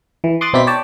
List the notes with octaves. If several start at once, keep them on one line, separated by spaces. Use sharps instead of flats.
E3
C6 D6 D#6 F#6 A6
B2 C4 D#4 E4 D5 B6
C#5 D5 G5 A5